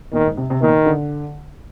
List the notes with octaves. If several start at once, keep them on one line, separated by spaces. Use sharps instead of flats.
A#2 D#3
G#2
C3
C3
A#2 D#3
D3